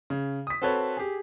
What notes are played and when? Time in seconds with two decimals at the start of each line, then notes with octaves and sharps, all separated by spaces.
0.10 C#3
0.47 D#6 B6
0.62 C4 F#4 A4 B4 C#5
0.97 G4 G#4